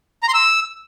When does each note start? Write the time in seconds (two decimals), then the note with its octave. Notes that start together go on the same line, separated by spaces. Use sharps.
0.23 A#5
0.28 C6
0.34 E6